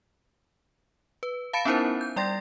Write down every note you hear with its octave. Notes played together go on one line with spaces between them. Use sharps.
B4
F5 A5 B5 A6 C#7 D7
B3 C#4 D#4 E4 A#4 C5
G6
G3 D5 G5 C6 A6 A#6